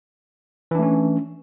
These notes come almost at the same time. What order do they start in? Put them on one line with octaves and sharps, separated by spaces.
E3 D4 A3 C#4